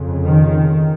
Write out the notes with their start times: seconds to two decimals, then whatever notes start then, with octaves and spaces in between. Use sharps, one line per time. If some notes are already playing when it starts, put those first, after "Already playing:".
Already playing: F2 C#3
0.26 D#3